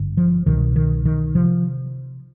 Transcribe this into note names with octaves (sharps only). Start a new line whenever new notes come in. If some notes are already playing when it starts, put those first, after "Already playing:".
Already playing: G#1 G2 D3
F3
C2 B2 D#3
D#3
D#3
C3 F3